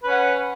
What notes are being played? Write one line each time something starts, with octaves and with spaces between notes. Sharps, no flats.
C#4 B4 F#5